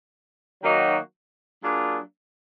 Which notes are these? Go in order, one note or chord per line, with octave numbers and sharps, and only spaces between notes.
D#3 F#3 A#3 D#4 F#4
F#3 A#3 D4 F4 G#4